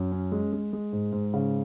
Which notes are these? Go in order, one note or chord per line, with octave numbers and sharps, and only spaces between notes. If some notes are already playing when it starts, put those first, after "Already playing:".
Already playing: F#2
C#4
G#3
G#3
G#3
G#2
G#2
C#3